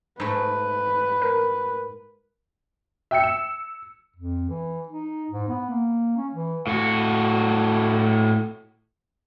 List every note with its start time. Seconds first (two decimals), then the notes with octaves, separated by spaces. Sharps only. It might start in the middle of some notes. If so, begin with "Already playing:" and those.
0.20 G#2 A3 B4
1.22 A#4
3.11 E5 G5 E6 C#7
3.24 E7
4.16 F2
4.49 E3
4.88 D#4
5.30 G#2
5.48 B3
5.70 A#3
6.17 C#4
6.35 E3
6.67 A2 F#4